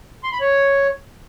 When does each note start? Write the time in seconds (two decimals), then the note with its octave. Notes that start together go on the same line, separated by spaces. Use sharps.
0.23 C6
0.32 B5
0.40 C#5